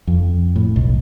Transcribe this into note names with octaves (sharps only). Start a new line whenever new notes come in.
F2
A2
B1